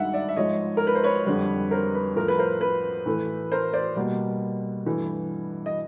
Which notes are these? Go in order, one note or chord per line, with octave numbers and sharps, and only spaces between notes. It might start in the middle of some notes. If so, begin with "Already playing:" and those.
Already playing: G2 D#3 G#3 E5 F#5
D5 E5
E5
G#2 F3 G#3 C#5 D#5
A#4
B4
C5
B4 C#5
F2 D3 G3
A#4 C5
B4
A2 F3 A3 A#4
B4
A#4 C5
B4
A2 E3 A3
A#4 C5
C5 D5
B2 G3 A#3
G2 E3 A3
D#5